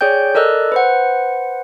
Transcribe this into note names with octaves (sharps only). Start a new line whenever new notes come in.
G#4 C#5 D5 G5 G6
A4 A#4 D5 D#5 E6 F#6
B4 C5 F#5